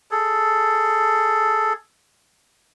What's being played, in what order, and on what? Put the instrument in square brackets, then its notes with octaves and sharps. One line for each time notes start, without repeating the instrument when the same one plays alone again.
[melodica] G#4 A4